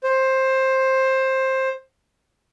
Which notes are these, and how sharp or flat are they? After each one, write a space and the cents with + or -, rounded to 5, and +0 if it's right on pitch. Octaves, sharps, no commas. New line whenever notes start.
C5 +15